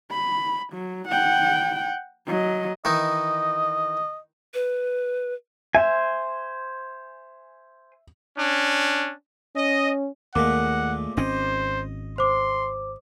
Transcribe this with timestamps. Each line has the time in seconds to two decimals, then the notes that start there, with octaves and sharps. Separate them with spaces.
0.12 B5
0.73 F#3
1.08 F#5 G5
2.27 F#3 D#5
2.85 D#3 E3 D#4 D#5
4.54 B4
5.75 C5 E5 G#5
8.37 C#4 D4
9.56 C#4 D#5
10.35 D#2 A#2 G#3 A3 F#5 D6
11.17 G#1 C4 C#4 C5 D#5
12.18 C5 C6 D6